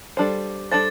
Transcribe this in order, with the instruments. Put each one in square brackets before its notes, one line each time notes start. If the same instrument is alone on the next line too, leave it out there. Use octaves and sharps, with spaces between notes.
[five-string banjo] G3 D4 A4 C5
[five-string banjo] G3 D4 A4 C5 [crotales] A6